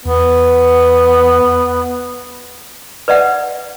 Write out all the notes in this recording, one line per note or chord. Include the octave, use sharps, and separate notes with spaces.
E2 B3
B4 D5 E5 F#5